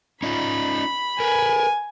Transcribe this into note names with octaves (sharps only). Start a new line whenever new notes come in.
C#4 D#4 F4 B5
A#4 B4 G#5